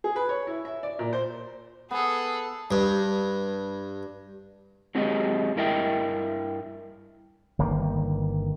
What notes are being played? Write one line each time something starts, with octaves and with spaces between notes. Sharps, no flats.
G#4
B4
C#5
E4
E5
D5
A#2
C5
B3 G#4 A4
G2
F#3 G#3 C4 G4 G#4 D#5
G2 E4 A#4 D#5 E5 G5
G1 D#3 A#3